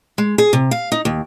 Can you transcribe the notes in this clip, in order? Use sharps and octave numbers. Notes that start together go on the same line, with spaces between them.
G#3
G#4
C3
F5
D#4
D#2